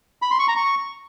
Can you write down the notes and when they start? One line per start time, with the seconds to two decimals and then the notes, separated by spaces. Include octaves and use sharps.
0.22 B5
0.31 C6
0.39 C#6
0.48 A#5
0.57 C#6